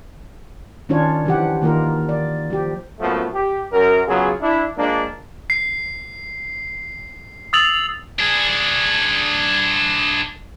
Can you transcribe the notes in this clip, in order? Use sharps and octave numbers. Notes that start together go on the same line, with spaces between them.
D#3 C#4 D4 F4 C#5
E3 F3 G4 F#5
D#3 A#3 F4 A#4
D5
F3 G4
F#2 A#2 F3 A3 B3 F#4
G4
F#2 A#4
C#3 F#3 B3 F4 G#4
D4 E4
F3 G#3 A#3 D4
C7
D#6 E6 A6 F7 F#7
D4 G#4